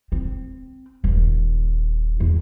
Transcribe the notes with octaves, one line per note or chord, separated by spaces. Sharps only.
C4
D#1
E2